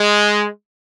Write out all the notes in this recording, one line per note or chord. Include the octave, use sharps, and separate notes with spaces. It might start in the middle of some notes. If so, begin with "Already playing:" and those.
Already playing: G#3